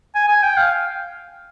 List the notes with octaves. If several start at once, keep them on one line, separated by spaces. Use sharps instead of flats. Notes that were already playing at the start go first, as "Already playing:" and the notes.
G#5
G#5
G5
F5